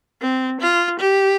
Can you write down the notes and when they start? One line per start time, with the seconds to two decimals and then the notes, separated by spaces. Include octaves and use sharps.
0.21 C4
0.61 F4
1.00 G4